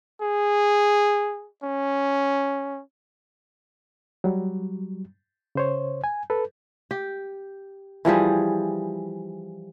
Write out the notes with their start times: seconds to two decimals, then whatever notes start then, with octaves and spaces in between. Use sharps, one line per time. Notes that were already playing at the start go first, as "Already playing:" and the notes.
0.21 G#4
1.63 C#4
4.24 F#3 G3
5.55 C#3 C5 C#5
6.04 G#5
6.30 A4 B4
6.91 G4
8.05 E3 F3 G3 G#4